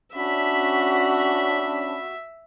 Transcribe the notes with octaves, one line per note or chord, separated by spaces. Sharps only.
C#4 D4 F#4 E5 B5